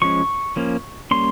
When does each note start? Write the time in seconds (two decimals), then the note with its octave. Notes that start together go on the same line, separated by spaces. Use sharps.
0.02 F3 G#3 C#4 C#6
0.56 F3 A#3 C#4
1.11 G3 A#3 C#4 C6